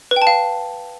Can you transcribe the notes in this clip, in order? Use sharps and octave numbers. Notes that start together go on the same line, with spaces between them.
B4
G5
A5
F5